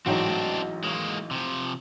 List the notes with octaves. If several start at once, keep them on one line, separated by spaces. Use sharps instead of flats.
A1 G#2 F#3 C4 D4 D#4
A3
G#3 A#3 C#4
C3 F3